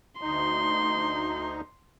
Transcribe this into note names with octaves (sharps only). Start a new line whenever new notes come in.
D2 D#4 C6